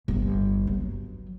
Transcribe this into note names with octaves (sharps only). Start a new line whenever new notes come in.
G1
F#3